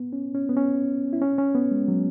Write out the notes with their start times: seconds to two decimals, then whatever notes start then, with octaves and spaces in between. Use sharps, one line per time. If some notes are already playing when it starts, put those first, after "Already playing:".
Already playing: B3
0.13 C#4
0.35 C#4
0.49 B3
0.56 C#4
1.13 E4
1.22 C#4
1.38 C#4
1.55 B3
1.71 G#3
1.88 F#3